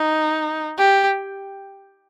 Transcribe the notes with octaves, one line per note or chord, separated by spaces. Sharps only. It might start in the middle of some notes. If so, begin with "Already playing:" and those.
Already playing: D#4
G4